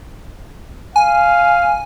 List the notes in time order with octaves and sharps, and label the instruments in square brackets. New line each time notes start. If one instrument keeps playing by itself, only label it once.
[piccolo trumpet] F5 [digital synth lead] G#5